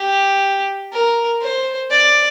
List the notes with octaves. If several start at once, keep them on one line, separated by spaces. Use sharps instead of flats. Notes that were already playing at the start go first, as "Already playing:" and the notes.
Already playing: G4
A#4
C5
D5